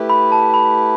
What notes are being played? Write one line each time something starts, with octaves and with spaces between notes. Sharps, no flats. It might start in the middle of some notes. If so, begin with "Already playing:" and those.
Already playing: A3 E4 G4 B4
B5
A5
B5